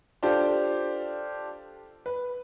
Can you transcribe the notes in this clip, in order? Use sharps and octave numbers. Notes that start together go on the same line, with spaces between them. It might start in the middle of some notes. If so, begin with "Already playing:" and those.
D4 F4 G4 A4 C5
B4